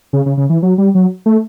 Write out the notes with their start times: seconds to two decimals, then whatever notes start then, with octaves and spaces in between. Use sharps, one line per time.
0.13 C#3
0.26 C#3
0.37 C#3
0.50 E3
0.63 F#3
0.78 G3
0.95 F#3
1.26 A3